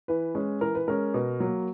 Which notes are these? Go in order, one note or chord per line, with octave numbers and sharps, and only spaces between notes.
E3 B4
G#3 C#4
E3 A#4
B4
G#3 C#4 A#4
B2
F#3 A#3